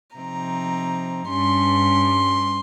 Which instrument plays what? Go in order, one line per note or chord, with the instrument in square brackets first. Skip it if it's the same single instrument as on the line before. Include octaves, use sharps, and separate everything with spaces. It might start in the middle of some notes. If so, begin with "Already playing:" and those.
[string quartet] C3 F3 C4 D#4 A#5
G2 G3 C#4 C6